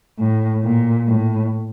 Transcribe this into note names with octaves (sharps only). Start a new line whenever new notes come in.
A2
A#2
A2